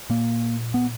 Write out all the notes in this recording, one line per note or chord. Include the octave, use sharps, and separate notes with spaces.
A#2 A#3
B3